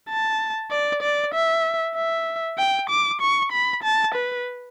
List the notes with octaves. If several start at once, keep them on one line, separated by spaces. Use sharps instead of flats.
A5
D5
D5
E5
E5
G5
D6
C#6
B5
A5
B4